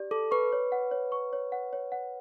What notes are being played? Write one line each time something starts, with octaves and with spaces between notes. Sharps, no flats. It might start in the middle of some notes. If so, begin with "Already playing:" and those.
Already playing: G4 D5
A4 D6
B4 C#6
C#5
F#5
C#5
C#6
C#5
F#5
C#5
F#5